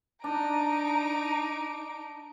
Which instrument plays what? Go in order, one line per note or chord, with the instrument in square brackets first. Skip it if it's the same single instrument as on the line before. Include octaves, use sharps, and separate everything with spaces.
[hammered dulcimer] D4 [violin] D#4 D7 [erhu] A#5